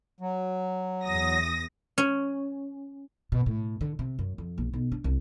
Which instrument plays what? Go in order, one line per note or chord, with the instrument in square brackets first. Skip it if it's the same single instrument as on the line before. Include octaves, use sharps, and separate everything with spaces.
[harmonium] F#3
[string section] E2 D#6 A#6
[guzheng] C#4
[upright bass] B2
A2
D3
C3
F#2
F2
A#1
B1
D4
C2